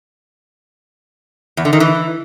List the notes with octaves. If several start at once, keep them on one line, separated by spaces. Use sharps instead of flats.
E2
D3
D#3
E3